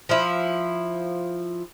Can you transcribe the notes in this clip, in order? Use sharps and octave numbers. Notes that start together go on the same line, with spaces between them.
F3 E4